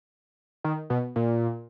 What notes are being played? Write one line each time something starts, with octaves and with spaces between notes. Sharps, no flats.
D#3
B2
A#2